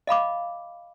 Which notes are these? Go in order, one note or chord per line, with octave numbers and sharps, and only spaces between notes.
D#5 F5 B5 D6